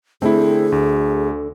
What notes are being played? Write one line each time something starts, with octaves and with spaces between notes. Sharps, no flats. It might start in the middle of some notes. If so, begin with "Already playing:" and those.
D3 A3 C4 E4 G#4
D2